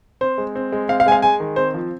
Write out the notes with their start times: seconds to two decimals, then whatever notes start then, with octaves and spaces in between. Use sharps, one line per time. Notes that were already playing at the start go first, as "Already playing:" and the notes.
0.21 C4 C5
0.38 G#3
0.55 C4
0.72 G#3
0.89 C4 F5
1.00 F5
1.06 G#3 G#5
1.12 F5
1.22 G#3 G#5
1.40 D#3
1.56 C4 C5
1.74 F3